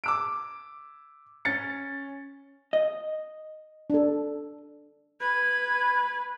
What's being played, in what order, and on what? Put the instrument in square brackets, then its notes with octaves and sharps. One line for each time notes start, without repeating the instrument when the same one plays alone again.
[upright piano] D6 E6 D7
C#4 A6 C#7
[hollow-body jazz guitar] D#5
[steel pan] D4 A4
[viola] B4 [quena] G#6